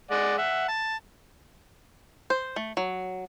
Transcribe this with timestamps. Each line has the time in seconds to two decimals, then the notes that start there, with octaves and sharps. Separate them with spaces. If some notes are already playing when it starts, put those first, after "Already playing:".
0.11 G#3 D5 F#5
0.38 E5 F#5
0.68 A5
2.30 C5
2.56 A3
2.77 F#3